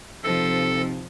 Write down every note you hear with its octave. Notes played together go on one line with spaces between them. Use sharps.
C3 F3 C4 D#4 A4